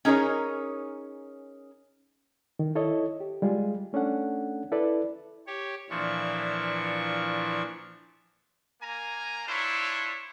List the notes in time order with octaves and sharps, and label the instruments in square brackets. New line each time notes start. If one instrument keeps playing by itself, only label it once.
[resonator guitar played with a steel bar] C#4 D#4 G#4 A#4 C#5
[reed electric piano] D#3
E4 A4 C#5 D#5
G4
G3 G#3 F4 G#4
A3 C#4 D4 A4 F#5
E4 A4 B4 D5
[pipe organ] G4 C#5
A#2 E3 F3 D4 C#6
[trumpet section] A#3 G#5 A#5
D4 E4 F4 C5 C#5 E5